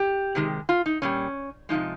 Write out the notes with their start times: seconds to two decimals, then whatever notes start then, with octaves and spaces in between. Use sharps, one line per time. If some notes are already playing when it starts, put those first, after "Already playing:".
Already playing: G4
0.35 C3 D#3 G#3
0.69 F4
0.86 D#4
1.02 A#2 G3 C#4
1.69 C3 F3 G#3 D#4